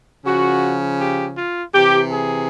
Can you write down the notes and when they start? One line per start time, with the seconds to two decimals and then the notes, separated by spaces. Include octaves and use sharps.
0.25 C#3 F3 F#4
1.00 G4
1.37 F4
1.74 C3 E3 G4
2.12 G#4